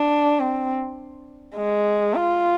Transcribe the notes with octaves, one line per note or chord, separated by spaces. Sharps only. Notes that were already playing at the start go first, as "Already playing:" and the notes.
Already playing: D4
C4
G#3
F4